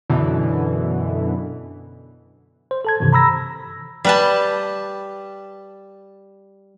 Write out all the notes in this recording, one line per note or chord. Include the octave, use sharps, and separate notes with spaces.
F#2 B2 D3 E3
C5
A4 A5 G#6
G2 C3 D#3 E3
A#5 B5 E6 A#6
G3 B4 A5